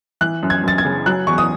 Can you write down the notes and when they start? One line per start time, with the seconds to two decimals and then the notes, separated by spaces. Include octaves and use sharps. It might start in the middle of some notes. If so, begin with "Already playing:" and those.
0.21 E3 F#6
0.43 F#2
0.50 G#6
0.64 F#2 A6
0.78 G#6
0.85 C#3
1.06 F#3 F#6
1.27 E2 C#6
1.38 D#6